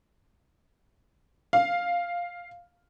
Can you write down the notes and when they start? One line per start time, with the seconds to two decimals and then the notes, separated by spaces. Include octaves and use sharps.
1.53 F5